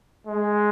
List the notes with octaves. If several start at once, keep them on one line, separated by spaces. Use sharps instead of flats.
G#3